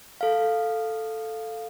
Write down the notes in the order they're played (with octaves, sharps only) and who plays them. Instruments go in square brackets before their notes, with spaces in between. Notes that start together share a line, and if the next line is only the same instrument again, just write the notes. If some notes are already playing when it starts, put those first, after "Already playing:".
[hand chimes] A4 F5